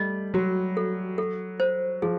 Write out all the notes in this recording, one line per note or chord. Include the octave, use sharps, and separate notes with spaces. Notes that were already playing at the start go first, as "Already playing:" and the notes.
Already playing: G3 A3 D#5
F#3 F#4
A4
A4
C5
F3 G#4